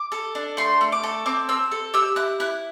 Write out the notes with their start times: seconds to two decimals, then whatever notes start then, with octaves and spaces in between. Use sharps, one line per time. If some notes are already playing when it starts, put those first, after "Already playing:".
Already playing: D6
0.12 A4
0.35 D4
0.57 A3 C6
0.81 A3
0.92 D6
1.03 A4
1.26 C4 D6
1.49 C4 E6
1.71 A4
1.94 G4 E6
2.16 E4 F#6
2.40 E4 F#6